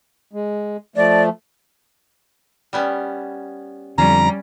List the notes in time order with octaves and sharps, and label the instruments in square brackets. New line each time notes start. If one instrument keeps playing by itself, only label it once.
[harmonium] G#3
[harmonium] F3 A3 [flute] D5
[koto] G3 B3 C#4
[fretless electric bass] F2 D3 [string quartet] G3 [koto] C#4 [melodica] A#5